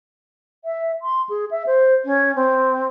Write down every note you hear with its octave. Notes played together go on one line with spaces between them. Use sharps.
E5
C6
G#4
E5
C5
C#4
C4